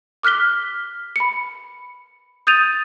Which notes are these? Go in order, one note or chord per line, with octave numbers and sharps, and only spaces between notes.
D6 F6 F#6 B6 G7
B5 C#7
D#6 G6 A6 D#7 F7